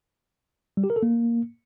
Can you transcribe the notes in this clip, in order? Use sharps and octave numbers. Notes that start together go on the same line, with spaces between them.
G3
G4
A#4
A4
A#3